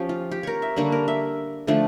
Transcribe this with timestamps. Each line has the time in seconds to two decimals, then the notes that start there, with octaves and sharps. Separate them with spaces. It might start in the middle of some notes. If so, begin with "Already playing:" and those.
Already playing: F3 C#4 G4
0.09 F4
0.31 G4
0.43 A#4 C#5
0.62 E5
0.76 D3 G3 A#3 D4 C#5
0.92 A#4
1.08 E5
1.67 D3 F3 A3 D4